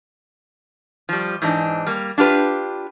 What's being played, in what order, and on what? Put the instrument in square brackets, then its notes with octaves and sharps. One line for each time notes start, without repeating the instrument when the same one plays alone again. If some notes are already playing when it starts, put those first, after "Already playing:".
[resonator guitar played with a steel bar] F3 G3
G#2 E3 D4 D#4
G3 A#3
D4 F4 G4 B4